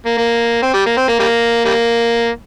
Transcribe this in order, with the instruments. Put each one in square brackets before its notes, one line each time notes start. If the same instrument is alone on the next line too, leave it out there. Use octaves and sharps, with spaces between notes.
[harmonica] A#3
A#3
C4
G3
A#3
C4
A#3
G3 A#3
G3 A#3